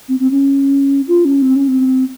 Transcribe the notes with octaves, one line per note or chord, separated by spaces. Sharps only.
C4
C4
C#4
F4
C#4
C4
C#4
C4